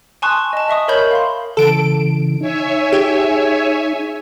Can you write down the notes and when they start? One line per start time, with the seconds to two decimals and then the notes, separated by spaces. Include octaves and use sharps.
0.22 G#5 A5 C6 C#6 D#6 F#6
0.53 D#5 A5
0.68 D#5 E5 C#6 D#6
0.88 A#4 C#5 D#5 B5 G6 F#7
1.11 F5 C6
1.57 C#3 E3 A4 D7
2.41 D#4 C#5 E5 G#5
2.93 G4 G#4